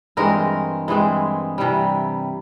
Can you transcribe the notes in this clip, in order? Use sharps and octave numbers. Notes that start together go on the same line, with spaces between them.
G2 E3 G#3 C4 A#4
G2 E3 G#3 C4
C3 E3 G3